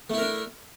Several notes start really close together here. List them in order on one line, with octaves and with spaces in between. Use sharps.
A3 E4 A#4 D4